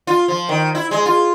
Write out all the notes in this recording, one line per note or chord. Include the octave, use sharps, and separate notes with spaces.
F4
F3
D#3
E4
G#3
F4